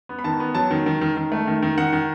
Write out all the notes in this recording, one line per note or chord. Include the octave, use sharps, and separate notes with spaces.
B3
B5
D#3 A5
B3
F#3 A5
D#3
D#3
D#3
D#3
A3
D#3
D#3
D#3 F#5
D#3